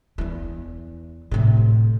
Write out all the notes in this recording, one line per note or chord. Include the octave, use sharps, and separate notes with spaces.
E2 E3
A2 C3